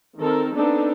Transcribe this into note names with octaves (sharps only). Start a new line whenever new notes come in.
D#3 C4 A4 A#4
B3 C4 D4 D#4 A4